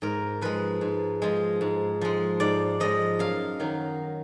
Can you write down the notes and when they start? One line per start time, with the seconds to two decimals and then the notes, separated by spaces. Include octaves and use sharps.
0.02 G#2 A#4
0.41 F3 G#3 B4
0.81 G#2
1.22 F3 G#3
1.61 G#2
2.01 F3 G#3
2.40 G#2 D5
2.80 F3 G#3 D#5
3.19 F#2 F5
3.60 D#3 F#3